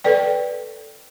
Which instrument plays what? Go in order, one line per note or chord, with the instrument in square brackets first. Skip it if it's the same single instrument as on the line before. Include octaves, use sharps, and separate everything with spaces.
[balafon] A4 B4 D5 G5